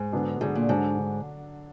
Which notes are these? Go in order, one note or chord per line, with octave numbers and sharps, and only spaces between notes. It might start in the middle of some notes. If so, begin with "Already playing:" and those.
Already playing: G#2
D3 F#3 B3 D4 G#4
G#2 D3 F#3 B3 D4 G#4
A#2
G#2 D3 F#3 D4
D3